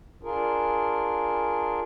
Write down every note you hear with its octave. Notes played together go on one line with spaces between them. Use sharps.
D4 F4 G#4 A#4